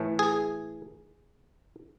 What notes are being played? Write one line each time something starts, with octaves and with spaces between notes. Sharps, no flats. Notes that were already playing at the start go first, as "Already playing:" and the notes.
Already playing: A2 E3 A3
G#4